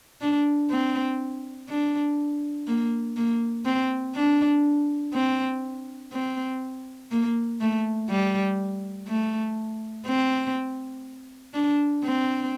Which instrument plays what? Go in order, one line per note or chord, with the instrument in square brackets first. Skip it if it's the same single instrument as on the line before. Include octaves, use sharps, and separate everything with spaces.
[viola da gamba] D4
C4
D4
A#3
A#3
C4
D4
C4
C4
A#3
A3
G3
A3
C4
D4
C4